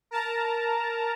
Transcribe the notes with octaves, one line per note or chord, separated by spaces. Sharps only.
A#4 A5 A#5